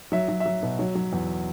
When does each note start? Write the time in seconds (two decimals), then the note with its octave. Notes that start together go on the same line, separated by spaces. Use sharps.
0.12 F#3 E5
0.28 F#3
0.40 E5
0.46 F#3
0.63 B2
0.79 F#3
0.95 F#3
1.13 E2